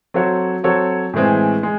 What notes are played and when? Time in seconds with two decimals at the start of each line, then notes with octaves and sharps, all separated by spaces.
0.14 F#3 C4 F#4 A4 C#5
0.64 F#3 C4 F#4 A4 C#5
1.14 A2 E3 G#3 C4
1.63 G#3